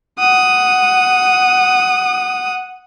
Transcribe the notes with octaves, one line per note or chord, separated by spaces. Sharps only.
F#5 D#6